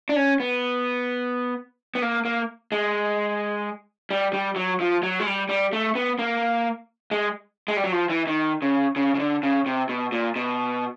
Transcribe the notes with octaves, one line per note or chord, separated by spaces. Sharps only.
D4
C#4
B3
B3
A#3
A#3
G#3
G3
G3
F#3
F3
F#3
G#3
G3
G3
A3
B3
A#3
G#3
G#3
G3
F#3
F3
E3
D#3
C#3
C#3
C#3
D3
C#3
C3
B2
A#2
B2